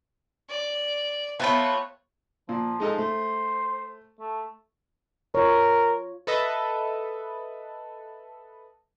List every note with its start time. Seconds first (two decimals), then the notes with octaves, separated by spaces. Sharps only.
0.50 D5
1.40 A3 B3 C4 F4 B4 C#5 E5
2.49 A#2 F3
2.80 G#3 D#4 A4
2.98 A3 C5
4.20 A3
5.35 F4 A#4 C#5
6.27 A4 B4 D#5 E5